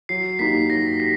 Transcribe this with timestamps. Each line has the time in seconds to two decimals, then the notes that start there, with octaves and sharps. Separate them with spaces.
0.09 F#3 C7
0.39 A#3 D#4 G4 B6
0.70 F#3 A#6
1.00 G4 B6